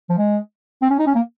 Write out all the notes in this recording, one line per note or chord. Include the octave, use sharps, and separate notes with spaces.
F3
G#3
C4
C#4
D#4
C#4
A#3